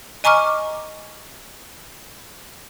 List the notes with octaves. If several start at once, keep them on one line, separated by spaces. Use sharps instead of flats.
D#5 G#5 A#5 C#6 D6 F6